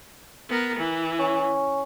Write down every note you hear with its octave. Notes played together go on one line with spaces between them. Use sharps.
B3 A#4
E3
C#4